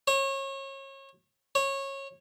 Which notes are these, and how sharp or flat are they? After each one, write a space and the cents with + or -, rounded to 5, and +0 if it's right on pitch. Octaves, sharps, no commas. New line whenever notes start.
C#5 -30
C#5 -20